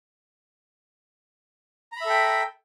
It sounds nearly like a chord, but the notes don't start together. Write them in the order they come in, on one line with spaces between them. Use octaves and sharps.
A#5 B5 E5 A4 G5